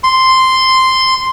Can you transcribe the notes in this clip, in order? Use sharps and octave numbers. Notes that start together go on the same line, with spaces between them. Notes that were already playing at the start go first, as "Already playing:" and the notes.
C6